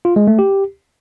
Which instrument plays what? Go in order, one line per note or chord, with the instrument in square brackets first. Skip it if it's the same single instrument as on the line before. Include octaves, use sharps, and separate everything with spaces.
[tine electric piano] F4
G#3
A3
G4